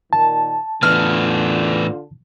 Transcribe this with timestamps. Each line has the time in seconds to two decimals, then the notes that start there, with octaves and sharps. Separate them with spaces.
0.13 A#2 D#3 A5
0.83 A2 D3 E3 B3 D4 F4 F6